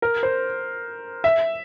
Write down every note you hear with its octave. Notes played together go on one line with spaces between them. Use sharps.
A#4
C5
E5